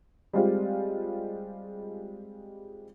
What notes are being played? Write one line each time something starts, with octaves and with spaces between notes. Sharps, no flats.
G3 G#3 C4 F4 G4